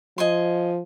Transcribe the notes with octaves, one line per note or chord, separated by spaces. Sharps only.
F3 D#5 G#5 C6